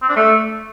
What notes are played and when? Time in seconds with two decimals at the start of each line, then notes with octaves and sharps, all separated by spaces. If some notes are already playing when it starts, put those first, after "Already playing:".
0.02 C4
0.09 D4
0.16 A3